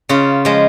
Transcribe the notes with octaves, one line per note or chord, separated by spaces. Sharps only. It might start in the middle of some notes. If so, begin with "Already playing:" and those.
C#3 F4
F3 G#3